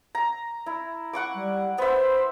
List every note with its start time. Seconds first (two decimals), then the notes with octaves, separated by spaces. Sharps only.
0.15 A#5
0.66 E4
1.13 F#5 C#6 D6
1.35 G3
1.78 B3 C5 E5